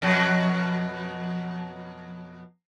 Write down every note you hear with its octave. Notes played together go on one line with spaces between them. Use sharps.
F2 B2 F#3